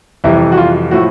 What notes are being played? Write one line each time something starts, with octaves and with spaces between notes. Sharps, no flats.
F2 C3 E3 G3 E4
F#4
F4
A2 F3 A3 F#4